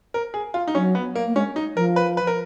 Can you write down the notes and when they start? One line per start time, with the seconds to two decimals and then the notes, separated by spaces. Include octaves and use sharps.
0.14 A#4
0.34 G#4
0.54 F4
0.68 D#4
0.75 F#3 C#4
0.95 B3
1.16 A#3
1.27 A#3
1.36 G#3 C#4
1.56 D#4
1.76 F3 A#4
1.96 B4
2.17 B4
2.27 A#4